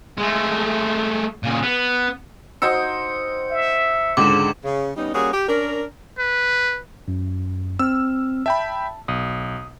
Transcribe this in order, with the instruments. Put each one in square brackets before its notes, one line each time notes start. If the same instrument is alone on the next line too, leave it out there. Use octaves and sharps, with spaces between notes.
[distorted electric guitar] G#3 A3
A#2 C#3
B3
[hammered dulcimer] D#4 C5 G5 [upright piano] F#4 D#5 E6 [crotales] C#7
[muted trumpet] E5
[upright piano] C#2 G#2 D3 [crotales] D6 E7
[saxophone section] C#3
G3 B3 C#4 D#4
G3 A#3 C#4 F#4 G#4
G4
C#4 D4 A#4
[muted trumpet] B4
[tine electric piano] F#2
[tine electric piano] C4 F6 [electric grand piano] E6
[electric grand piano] E5 G5 B5 [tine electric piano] A5
[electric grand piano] B1 [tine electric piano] D#6